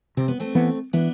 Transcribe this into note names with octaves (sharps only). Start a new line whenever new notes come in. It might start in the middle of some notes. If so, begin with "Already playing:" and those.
C3 C4
B3
A3 C4
E3 B3
E3 B3 D4